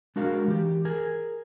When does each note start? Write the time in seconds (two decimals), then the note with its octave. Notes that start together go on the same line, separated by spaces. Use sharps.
0.16 G#3 D4 F#4 A#4 F5
0.48 E3 G4
0.85 G#4 A#4 G#5